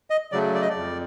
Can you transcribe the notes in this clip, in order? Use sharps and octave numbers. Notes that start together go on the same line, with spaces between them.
D#5
C#3 F#3 A3 D5
D5
D#5
D5
F2